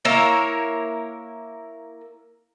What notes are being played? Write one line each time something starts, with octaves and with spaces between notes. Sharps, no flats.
A#3 E4 A#4 C#5